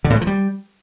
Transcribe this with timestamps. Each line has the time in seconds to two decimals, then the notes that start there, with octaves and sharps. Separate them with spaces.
0.05 D3
0.10 A2
0.16 G#3
0.21 F3
0.27 G3